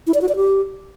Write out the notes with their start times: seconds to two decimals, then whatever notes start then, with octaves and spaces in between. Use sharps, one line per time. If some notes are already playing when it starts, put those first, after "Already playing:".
0.07 E4
0.14 D5
0.21 F#4
0.29 D5
0.36 G4